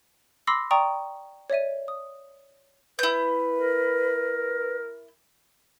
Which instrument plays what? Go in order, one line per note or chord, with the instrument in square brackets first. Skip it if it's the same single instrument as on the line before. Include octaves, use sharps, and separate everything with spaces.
[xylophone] B5 C6 D6 E6 A#6 C7
D5 G5 A#5 C#6 D#6
C#5 D5 E5 D#7
D#6
[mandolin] E4 G6 [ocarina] B4
[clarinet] A#4